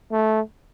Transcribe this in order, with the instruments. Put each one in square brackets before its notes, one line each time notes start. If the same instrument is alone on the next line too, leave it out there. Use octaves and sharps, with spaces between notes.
[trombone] A3